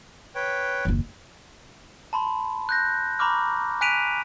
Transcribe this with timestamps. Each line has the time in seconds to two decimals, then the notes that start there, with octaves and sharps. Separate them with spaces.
0.35 B4 C#5 G5
0.85 F#1 D#2
2.13 A5 B5 C6
2.69 F#6 G6 A#6
3.19 A#5 B5 C#6 D6 F6
3.81 G#5 F#6 B6 D7 D#7 F7